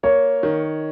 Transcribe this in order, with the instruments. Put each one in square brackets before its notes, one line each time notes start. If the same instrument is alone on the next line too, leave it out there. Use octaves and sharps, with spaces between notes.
[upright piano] A#3 [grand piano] C#5
[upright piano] D#3